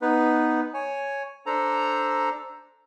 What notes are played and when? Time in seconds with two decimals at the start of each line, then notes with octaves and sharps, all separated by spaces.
0.02 B3 D#4 B4
0.74 C#5 G#5
1.46 D4 A4 C5 A#5